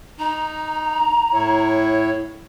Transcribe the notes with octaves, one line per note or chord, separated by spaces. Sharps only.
D#4 A#5
A2 E4 C#5